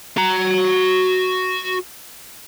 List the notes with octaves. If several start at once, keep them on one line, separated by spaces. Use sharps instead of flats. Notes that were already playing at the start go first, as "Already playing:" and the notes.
F#4 A#5